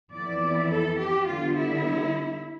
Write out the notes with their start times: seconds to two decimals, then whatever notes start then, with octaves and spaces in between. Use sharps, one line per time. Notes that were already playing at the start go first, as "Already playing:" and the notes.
0.12 F2 E3 B3 E4 D5
0.70 A4
0.98 G4
1.27 D3 G3 B3 F4
1.56 E4